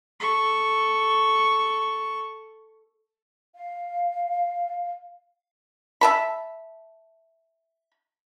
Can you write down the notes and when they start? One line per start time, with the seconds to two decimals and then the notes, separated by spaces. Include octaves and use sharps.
0.20 A4 C#6
3.54 F5
6.01 E5 A5 B5